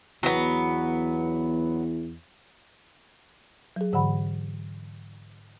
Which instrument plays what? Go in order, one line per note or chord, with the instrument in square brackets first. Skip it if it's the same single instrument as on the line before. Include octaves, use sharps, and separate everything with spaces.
[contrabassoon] E2 [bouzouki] F#3 B3
[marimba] F#3 G#4
G#2 D3 E3 F#5 B5